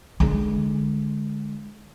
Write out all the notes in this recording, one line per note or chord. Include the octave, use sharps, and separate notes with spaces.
D3 G#3